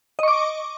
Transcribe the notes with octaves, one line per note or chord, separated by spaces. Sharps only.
D#5 C#6 D6